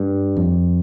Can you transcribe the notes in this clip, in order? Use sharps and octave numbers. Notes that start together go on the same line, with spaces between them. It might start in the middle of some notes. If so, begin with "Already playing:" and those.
Already playing: G2
F2